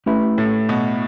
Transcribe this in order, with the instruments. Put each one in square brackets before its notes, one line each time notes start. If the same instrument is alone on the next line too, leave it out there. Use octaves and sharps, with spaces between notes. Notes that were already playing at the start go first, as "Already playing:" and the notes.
[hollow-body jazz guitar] A3 C#4 E4 G4 B4
[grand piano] A2
B2